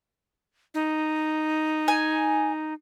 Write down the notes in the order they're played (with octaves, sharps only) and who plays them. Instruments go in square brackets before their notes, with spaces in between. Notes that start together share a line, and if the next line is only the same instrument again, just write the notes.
[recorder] D#4
[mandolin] G#5